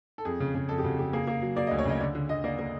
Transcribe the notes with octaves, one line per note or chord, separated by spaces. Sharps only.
A4
F2 G#4
C#3
C#3
F2 A4
G4
C#3 F#4
C#3 G4
A#3 G#4
A#3
F#3
A#3 D5
D#5
D2
C#5
C#3 D#5
D3 D5
D3
D3 D#5
A#3 D5
A#3